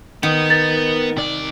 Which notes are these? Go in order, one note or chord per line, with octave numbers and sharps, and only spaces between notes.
D#3 B3
A#4 A6
C3 D5